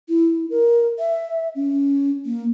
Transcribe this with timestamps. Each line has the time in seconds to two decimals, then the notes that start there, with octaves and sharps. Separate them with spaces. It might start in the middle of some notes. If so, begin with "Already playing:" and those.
0.09 E4
0.50 A#4
0.99 E5
1.55 C#4
2.26 A#3